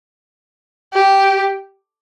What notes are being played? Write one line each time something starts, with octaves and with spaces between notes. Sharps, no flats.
G4